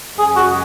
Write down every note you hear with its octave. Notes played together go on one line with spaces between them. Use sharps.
F#2 C#3 G#3 G#4
F#4